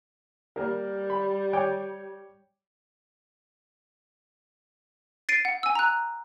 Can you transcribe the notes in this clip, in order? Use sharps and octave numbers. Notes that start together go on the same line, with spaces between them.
G3 A#3 A#4
B5
C#5 G5 D6
A6 C7 D7 D#7
F#5
G#5 E6
A#5 F#6